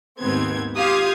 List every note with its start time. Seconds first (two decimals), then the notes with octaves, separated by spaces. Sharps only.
0.20 D#2 G#2 B3 C4 G#6
0.76 F4 G4 F5 D#6 G#6